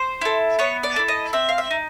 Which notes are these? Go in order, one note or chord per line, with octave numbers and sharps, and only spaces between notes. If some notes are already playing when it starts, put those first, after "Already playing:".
Already playing: C5
E4 A4
B3 C#5
D5
E4 A4
D#5
C4 E5
F5
E5
D#4